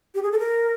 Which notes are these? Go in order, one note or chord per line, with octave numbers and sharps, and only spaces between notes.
G4
G#4
A4
A#4